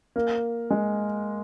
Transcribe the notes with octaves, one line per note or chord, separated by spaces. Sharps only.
A#3
G#3